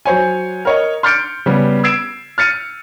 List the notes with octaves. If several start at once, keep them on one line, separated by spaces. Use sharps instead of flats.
F#3 C5 C#5 G#5
A#4 C#5 D#5
C6 F6 G6 A6 C#7 D7
C#3 G3 B3
E6 G#6 C7 D7 E7
F6 A6 C#7 D#7